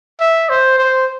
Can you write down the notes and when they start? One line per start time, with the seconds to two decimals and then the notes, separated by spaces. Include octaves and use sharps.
0.20 E5
0.49 C5
0.79 C5